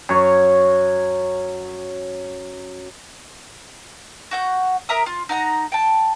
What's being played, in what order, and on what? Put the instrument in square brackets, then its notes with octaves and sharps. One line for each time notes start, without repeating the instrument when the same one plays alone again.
[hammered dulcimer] F#2 C#5
[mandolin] F#4 F#5 G6
A#4 E5 A#5 D#6
F4
D#4 F#5 A#5
G5 A5